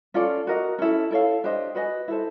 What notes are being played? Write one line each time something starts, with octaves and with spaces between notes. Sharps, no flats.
C#4 F4 A4 D5
F#4 A#4 D#5
C#4 E4 A4
E4 A4 C#5 F5
D4 G4 C5 D#5
F#4 B4 D#5 G#5
E4 A4 C5